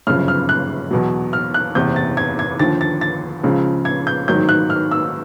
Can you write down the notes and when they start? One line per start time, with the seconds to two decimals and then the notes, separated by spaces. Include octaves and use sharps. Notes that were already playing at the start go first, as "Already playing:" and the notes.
0.07 G1 F#2 C#3 F3 F6
0.28 F6
0.49 F#6
0.91 E2 B2 F#3
1.33 F6
1.54 F#6
1.75 F#1 E2 C3 G6
1.96 A6
2.17 G#6
2.39 G#6
2.59 D#2 D3 F3 A6
2.81 A6
3.01 A6
3.43 C#2 C#3 F3
3.85 G#6
4.07 G6
4.28 A1 G#2 D#3 F#3 G6
4.49 F#6
4.70 F6
4.91 E6